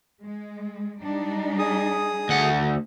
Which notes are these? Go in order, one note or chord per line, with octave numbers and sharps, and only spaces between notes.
G#3
G3 D4 D#4
G#4 D#6
D2 F#5